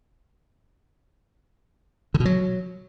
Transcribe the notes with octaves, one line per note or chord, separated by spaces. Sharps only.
D3
B2
F#3